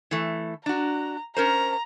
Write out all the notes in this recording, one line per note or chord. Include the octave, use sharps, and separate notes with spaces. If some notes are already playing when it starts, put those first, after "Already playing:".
E3 A3
D4 F#4 A#5
C#4 A#4 C5 A#5